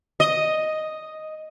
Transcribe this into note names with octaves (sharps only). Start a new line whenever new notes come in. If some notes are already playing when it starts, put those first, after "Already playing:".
D#5